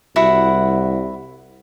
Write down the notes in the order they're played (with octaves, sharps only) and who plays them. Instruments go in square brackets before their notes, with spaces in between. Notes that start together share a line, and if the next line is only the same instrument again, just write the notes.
[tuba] C2 [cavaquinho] E4 F#4 F#5